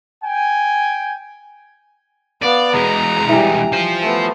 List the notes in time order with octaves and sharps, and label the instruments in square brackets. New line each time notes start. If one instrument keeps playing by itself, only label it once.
[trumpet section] G5 G#5
[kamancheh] B3 F5 [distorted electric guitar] D5
[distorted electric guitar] E2 G#3 [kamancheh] A#5
[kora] E3 G3
[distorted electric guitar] F4 C5
[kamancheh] A3 B3